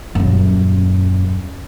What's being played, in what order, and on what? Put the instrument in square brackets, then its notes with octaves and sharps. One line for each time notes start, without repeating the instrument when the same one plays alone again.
[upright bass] D#1 F#2